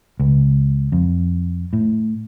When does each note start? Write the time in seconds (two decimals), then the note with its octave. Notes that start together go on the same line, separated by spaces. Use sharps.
0.20 C#2
0.92 F2
1.73 A2